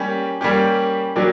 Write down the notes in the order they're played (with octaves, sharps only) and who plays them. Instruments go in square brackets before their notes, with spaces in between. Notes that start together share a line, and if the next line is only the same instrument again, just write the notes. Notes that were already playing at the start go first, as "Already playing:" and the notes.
Already playing: [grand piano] G3 A#3 C#4 G4
G3 A#3 C#4 G4
F#3 A#3 D4 G4